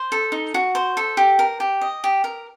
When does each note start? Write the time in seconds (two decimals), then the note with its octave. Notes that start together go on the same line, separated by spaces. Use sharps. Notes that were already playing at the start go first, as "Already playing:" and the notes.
Already playing: C5
0.12 A4
0.32 D#4
0.54 F#4
0.75 C5
0.97 A4
1.17 G4
1.39 A#4
1.60 G4
1.81 D#5
2.04 G4
2.24 A#4